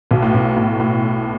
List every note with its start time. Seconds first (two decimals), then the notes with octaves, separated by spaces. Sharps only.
0.11 B1 B2
0.23 A2
0.34 B1 B2
0.57 A2
0.80 A2